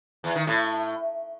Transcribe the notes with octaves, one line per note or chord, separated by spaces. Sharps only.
E2
D#3
A2